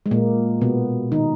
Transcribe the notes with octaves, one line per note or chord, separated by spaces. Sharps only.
G#3
A#2 A#3
B2 B3
D#3 D#4